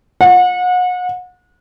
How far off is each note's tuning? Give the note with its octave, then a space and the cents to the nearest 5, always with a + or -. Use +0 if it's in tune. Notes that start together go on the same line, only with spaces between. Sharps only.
F#5 -35